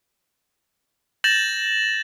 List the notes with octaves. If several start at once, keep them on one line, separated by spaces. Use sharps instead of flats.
G6 A6 A#6 E7 F#7